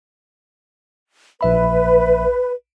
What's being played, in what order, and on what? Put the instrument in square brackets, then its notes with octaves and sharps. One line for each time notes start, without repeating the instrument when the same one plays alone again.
[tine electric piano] A#1 E5 B5 [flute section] B4